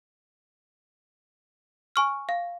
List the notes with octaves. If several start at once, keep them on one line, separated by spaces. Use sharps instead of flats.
G#5 C#6 F6
F5